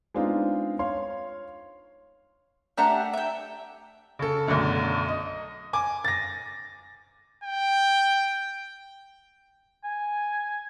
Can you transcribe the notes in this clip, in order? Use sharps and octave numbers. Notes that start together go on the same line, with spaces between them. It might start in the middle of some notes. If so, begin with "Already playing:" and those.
G#3 B3 C4 D4 D#4 F4
C#5 F5 C6
A3 D4 G4 E5 F#5 A#5
E5 G5
C#3 A4
B1 F#2 D3 A3
D#5
G#5 D6
A6 A#6
G5
G#5